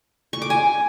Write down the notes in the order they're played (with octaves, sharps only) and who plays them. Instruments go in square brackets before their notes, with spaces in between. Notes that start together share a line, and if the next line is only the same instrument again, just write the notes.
[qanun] C#6
D6
G#5